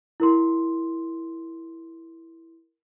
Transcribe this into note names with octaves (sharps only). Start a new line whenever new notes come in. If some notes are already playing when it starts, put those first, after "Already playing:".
E4 A#4 C6